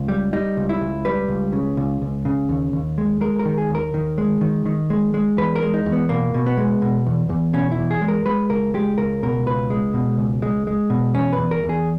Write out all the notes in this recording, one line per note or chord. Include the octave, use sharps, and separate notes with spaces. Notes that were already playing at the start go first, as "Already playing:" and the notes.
Already playing: C#2
G3
G3 D#4
C#2
E4
C#2
G3 B4
C#2
C#3
C#2
C#2
C#3
D#2
D#2
G#3
G#3 A#4
A#4
D#3
G#4
D#2 A#4
D#3
G#3
D#3
D#3
G#3
G#3
E2 B4
A#4
G#3
D#4
E2
B3
B2 A#3
B2
B3
G#3
B2
E2
E2
B2 C#4
E4
E2
G#4
G#3
A#4
G#3 B4
C#2 A#4
G#3 G4
C#2 A#4
B2 A#4
C#2 B4
G#3
B2
C#2
G#3
G#3
B2
E2 C#4
B4
E2
A#4
E2
G#4